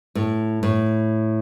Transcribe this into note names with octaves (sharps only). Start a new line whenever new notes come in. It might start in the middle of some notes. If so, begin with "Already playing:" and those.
A2
A2